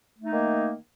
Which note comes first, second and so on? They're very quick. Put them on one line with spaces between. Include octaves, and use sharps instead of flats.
A3 D#4 A#3 D#3